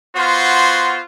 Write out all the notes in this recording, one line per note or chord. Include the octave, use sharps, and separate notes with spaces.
B3 F4 F#4 C5